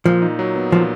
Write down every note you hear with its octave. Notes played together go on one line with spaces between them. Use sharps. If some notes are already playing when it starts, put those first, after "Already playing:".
A#2 F3
D#4
F#3
B3
A#2 F3